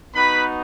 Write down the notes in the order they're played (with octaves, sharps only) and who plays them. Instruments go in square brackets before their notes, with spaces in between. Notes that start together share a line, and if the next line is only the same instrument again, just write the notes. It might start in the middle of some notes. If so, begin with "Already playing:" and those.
[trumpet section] B3 D#4 F#4 B4 B5